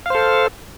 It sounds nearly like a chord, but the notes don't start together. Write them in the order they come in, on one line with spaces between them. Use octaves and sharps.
F5 C5 A4